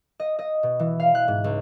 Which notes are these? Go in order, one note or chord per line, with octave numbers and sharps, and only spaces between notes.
D#5
D#5
B2
E3
F5
F#6
G#2
C#2